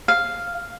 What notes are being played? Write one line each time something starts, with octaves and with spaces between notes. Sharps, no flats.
F5